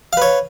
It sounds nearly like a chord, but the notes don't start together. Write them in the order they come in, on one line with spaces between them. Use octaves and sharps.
F5 B4 C#5